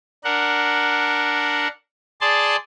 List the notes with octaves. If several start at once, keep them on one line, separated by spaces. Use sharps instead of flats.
D4 A#4 F#5
G#4 D5 A5 C6